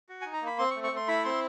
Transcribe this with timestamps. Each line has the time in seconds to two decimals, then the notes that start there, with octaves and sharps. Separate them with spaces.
0.09 F#4
0.22 D#4 G#5
0.33 A#5
0.41 A#3
0.47 B5
0.58 C4 C6
0.71 C#6
0.76 A3
0.84 C#6
0.92 A3 C6
1.08 E4 B5
1.25 C4 C6